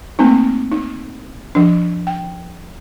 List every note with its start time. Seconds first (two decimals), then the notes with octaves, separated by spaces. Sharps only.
0.19 A3 A#3 C4 D#4
0.72 D#4
1.55 F3 D4
2.07 G5